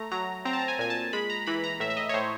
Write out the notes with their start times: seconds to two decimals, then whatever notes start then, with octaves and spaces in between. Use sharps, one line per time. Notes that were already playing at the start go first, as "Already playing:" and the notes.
Already playing: A3 A#5
0.12 F#3 A#5
0.45 C4 A#5
0.53 A5
0.59 A#5
0.68 G#5
0.79 A#2 G#5
0.90 A5
1.13 G#3 B5
1.30 A#5
1.47 E3 B5
1.64 A#5
1.80 A2 E5
1.90 E5
1.97 D#5
2.09 C#5
2.14 A2 C5